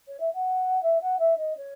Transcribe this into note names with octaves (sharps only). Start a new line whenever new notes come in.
C#5
E5
F#5
E5
F#5
E5
D#5
C#5